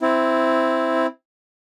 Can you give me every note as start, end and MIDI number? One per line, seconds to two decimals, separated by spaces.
0.01 1.06 60
0.01 1.06 64